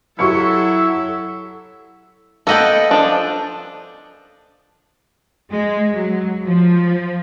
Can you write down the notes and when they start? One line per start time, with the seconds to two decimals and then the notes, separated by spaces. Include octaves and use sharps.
0.19 F#3 E4 G4 A4 E5 C#6 C#7
2.47 A#3 B3 A4 D#5 F#5 G5
2.91 F3 D4
5.51 G#3
5.92 F#3
6.43 F3